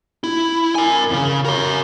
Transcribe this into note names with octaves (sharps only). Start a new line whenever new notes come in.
E4
A#4 G#5
E2 C#3
A#4 C#5